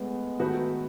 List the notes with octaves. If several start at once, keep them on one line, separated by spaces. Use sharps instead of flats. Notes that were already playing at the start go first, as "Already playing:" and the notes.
Already playing: A2 G#3 B3
D#3 A3 D#4 F#4 B4